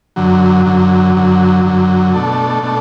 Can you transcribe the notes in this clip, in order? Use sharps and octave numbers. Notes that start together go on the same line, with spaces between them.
F#2 D3 F#3
F#2 D3 F#3
F#2 D3 F#3
F#2 D3 F#3
B2 A3 D4 A4
B2 A3 D4 A4